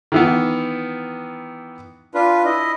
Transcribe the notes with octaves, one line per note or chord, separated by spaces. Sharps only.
D#3 E3 B3
D4 F4 B4
E4 D#5